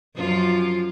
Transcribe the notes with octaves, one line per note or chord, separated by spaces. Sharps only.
F#2 F3 F4